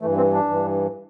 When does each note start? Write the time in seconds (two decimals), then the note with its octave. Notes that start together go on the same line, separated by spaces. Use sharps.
0.01 E3 A3
0.05 G2
0.17 C4
0.33 D4
0.49 G2 E3